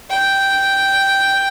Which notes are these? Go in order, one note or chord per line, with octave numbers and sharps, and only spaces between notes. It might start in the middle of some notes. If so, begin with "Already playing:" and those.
G5